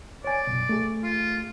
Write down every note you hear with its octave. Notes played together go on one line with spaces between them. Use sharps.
C#5 D5 G#5
C2 F#2 B2
A3 G#4
F4